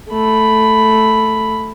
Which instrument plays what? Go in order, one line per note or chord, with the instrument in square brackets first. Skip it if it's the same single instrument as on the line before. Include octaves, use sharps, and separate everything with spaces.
[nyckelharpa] A3 B5